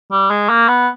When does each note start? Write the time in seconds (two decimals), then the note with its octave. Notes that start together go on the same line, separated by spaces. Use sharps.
0.12 G3
0.30 G#3
0.50 A#3
0.68 B3